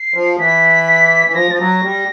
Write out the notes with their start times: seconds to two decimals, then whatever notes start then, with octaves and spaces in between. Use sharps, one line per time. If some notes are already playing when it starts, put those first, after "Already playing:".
Already playing: C7
0.14 F3
0.38 E3 B6
1.27 E3 B6
1.34 F3 A#6
1.51 F3 A6
1.58 F#3 A#6
1.83 G3